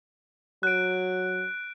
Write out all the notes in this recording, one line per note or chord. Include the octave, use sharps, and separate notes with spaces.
F#3 F#6 D7